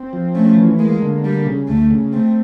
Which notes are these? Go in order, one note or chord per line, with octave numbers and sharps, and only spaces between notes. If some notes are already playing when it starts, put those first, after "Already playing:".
Already playing: C4
F3
A3 C#4
E3
G#3 A#3
D3
G3 A#3
C#3
D2 A3
C#3
A3 C4